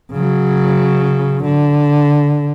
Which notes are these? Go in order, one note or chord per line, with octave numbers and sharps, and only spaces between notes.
C#3 F#3
D3